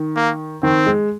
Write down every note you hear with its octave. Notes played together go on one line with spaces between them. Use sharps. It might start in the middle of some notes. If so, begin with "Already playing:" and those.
Already playing: D#3
A#3
D#3 C4
G#3